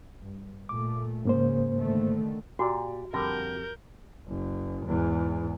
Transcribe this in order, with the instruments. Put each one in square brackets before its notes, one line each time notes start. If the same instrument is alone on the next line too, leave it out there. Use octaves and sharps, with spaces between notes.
[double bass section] G2
[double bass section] A#2 A3 [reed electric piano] D6
[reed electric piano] G#2 A#3 C5 [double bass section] C#3
[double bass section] D3 D#3 A3
[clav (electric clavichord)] A#2 [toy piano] F#4 [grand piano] G4 D5
[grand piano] F2 G4 A#6 [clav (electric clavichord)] D3 G3 [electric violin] A#4 G6
[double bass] F#1
E2 G#2